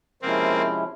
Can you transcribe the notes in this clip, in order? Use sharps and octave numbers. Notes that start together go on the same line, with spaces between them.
C3 F3 G#3 A#3 C4 C#4 E4